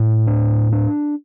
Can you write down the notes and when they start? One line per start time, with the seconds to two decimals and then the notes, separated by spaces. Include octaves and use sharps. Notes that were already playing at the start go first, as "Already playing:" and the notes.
Already playing: A2
0.27 D4
0.73 D4